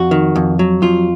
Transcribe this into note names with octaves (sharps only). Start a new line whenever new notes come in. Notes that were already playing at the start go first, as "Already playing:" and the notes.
Already playing: F2 F#4
D#3
F2
F#3
F2 F4